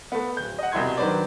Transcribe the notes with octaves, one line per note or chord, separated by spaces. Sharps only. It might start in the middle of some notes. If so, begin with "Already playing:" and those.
A3 B3
D1 G6
D#5 F#5
C2 B2 E4 C6 G#6
D#3 F#3 D4 B4 C5 D5